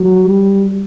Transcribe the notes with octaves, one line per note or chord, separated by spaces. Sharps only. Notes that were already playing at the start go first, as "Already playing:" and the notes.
Already playing: F#3
G3